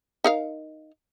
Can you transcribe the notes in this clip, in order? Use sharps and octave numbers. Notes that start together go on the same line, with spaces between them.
D#4 A#4 F5